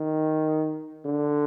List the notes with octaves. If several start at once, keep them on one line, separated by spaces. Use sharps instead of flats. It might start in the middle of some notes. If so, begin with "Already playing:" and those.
Already playing: D#3
D3